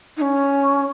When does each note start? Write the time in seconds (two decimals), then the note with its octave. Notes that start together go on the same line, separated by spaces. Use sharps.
0.16 D#4
0.21 C#4